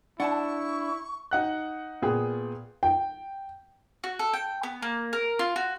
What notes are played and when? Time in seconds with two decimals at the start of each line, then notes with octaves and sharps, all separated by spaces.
0.20 D4 E4 F#5 G#5 A5 C#6
1.31 D#4 F#5 F#6
2.02 A#2 B3 G#4 G5
2.83 G5
4.04 F#4
4.19 A4
4.33 G5
4.63 B3
4.82 A#3
5.13 A#4
5.39 F4
5.56 F#4